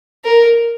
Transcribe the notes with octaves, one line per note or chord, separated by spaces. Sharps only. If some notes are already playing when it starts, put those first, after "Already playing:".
A#4